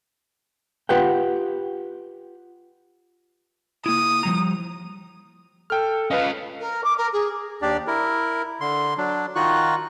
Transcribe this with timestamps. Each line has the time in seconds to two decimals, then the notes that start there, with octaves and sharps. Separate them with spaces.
0.89 F4 G4 B4 F#5 G5
3.86 A#3 E4 D#6
4.23 F3 G3 A#5
5.70 A4 G5 F6
6.11 C#4 F4 B4 D#5 F5
6.60 A#4
6.83 D6
6.97 A#4
7.12 G#4
7.62 D#2 D4 G4 D5
7.87 E4 A#4
8.61 D3 C6
8.98 F#3 D4
9.35 D#3 D#4 F4 F#4 C#6 F#6